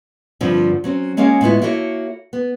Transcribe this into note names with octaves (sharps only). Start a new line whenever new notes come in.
G2 D3 F3 C4
F#3 C4 C#4
G#3 A#3 C#4 G#4 F5
A2 G#3 B3 E4
A#3 E4 F#4 A4 C#5
B3